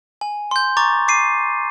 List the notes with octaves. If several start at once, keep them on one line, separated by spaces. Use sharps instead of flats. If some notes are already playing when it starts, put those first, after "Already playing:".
G#5
C6 G6
A#5 C#6 D6 A6
D6 C7 D#7